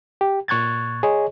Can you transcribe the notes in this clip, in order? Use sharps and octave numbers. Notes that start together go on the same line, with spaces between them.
G4
A#2 C#6 F#6 G#6 A6
G#4 C#5 D#5